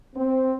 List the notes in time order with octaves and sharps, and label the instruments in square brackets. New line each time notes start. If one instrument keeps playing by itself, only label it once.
[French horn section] C4